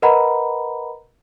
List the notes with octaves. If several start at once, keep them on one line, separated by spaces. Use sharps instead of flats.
A#4 B4 D#5 F#5 A#5 B5